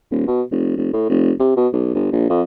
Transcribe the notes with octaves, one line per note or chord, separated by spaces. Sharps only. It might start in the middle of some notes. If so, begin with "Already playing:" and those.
D#1
B2
F1
F1
A2
F1
C3
B2
B1
G1
A#1
F2